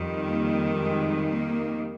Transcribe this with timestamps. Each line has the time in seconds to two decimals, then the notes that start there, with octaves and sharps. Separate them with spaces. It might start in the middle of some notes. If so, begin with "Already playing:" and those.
Already playing: F2 D#3 G3
0.24 A#3
0.77 G#3
1.30 A#3